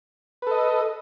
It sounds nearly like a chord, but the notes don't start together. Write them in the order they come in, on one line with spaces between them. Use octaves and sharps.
B4 A4 D#5